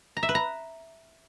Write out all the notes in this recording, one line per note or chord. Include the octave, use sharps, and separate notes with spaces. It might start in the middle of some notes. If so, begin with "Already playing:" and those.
A#5
E5
B4
A#5